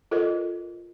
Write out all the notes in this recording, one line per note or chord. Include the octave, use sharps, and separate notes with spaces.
F4 A4 A#4 C5 D#5